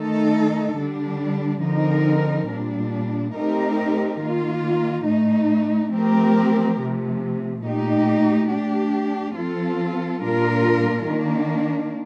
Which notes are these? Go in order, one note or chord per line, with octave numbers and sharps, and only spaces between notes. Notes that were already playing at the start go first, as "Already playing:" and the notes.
Already playing: D#3 A3 D#4 A4
D3 G3 D4
D3 F3 C4 D#4 A#4
A#2 G3 D4
A3 C4 D#4 G4 A#4
D#3 A#3 F4
A2 A3 D#4
F3 A3 C4 G4 A#4
C3 F3 A3
A#2 A3 D#4 G4
A3 D4 G4
F3 C4 F4 A4
A#2 G3 D4 F4 A#4
D#3 A#3 D4